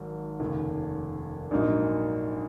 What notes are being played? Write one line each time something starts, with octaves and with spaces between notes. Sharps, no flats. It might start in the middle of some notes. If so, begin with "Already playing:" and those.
Already playing: G#1 G#2 F#3
F1 D#2 C#3
A#1 G#2 F#3 A#3 D#4